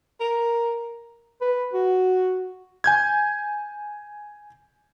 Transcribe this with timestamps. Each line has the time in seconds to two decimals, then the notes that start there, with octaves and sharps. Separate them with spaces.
0.20 A#4
1.41 B4
1.74 F#4
2.84 G#5 G6 G#6